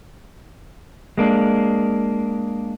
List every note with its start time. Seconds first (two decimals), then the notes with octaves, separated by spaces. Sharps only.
1.18 G#3 A#3 D4